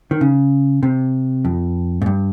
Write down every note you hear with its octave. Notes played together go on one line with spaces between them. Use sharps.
D#3
C#3
C3
F2
G#2
G2